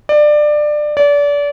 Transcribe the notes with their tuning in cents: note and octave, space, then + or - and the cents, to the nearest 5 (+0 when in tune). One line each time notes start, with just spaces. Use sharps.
D5 +20
D5 -30